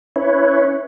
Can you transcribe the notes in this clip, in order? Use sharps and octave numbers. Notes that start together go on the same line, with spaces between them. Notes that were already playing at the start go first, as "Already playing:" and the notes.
C#4 E4 B4 C#5